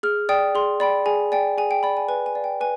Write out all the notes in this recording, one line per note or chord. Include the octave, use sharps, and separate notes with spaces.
G#4 F6
D5 G5 D#6
G#4 C6
D5 G5 B5
G#4 G#5
D5 G5 G#5
G#4 G#5
G5
D5 G5 B5
G#5
B4 G#5
G#5
D5 F5
G5
B4 G#5